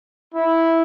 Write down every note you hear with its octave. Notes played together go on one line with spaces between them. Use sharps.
E4